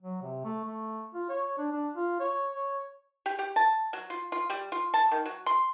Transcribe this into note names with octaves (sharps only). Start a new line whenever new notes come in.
F#3
C3
A3
A3
F4
C#5
D4
D4
F4
C#5
C#5
G4
G4
A5
F#3
F4
F4
G3
F4
A5
D#3
F#3
C6